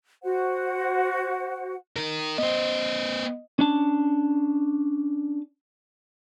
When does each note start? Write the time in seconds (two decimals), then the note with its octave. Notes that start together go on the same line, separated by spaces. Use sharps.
0.23 F#4 C5 F#5
1.96 D#4 A#4
2.38 B3 C5 D#5
3.59 C#4 D4 A5